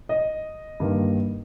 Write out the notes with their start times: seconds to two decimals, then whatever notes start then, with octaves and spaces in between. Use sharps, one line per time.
0.09 D#5
0.80 G2 D#3 A#3